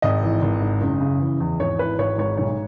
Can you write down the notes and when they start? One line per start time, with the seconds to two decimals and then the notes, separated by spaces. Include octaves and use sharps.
0.02 G#1 D#5
0.23 E3
0.42 G#1
0.61 G#2
0.81 F#1
1.01 C#3
1.21 E3
1.40 E2
1.60 G#1 C#5
1.79 E3 B4
1.98 G#1 C#5
2.18 G#2 C#5
2.37 B1 C#5